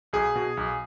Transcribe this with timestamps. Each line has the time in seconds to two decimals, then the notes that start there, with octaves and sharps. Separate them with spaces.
0.13 B1 G#4
0.35 B2
0.57 B1